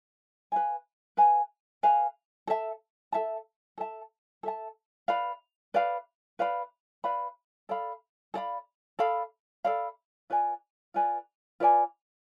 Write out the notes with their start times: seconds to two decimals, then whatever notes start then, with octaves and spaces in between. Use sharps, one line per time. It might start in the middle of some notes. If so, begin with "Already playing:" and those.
0.52 B4 F5 G#5
1.17 B4 F5 G#5
1.83 B4 F5 G#5
2.47 A4 E5 A5
3.12 A4 E5 A5
3.78 A4 E5 A5
4.43 A4 E5 A5
5.08 B4 D5 F5 B5
5.74 B4 D5 F5 B5
6.39 B4 D5 F5 B5
7.04 B4 D5 F5 B5
7.69 A4 D5 F5 B5
8.34 A4 D5 F5 B5
8.99 A4 D5 F5 B5
9.64 A4 D5 F5 B5
10.30 F4 B4 D5 G#5
10.94 F4 B4 D5 G#5
11.60 F4 B4 D5 G#5